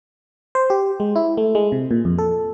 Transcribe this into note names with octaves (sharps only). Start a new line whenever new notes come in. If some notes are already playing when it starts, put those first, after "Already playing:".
C5
G4
G#3
E4
A3
G#3
C3
A#2
F2
A4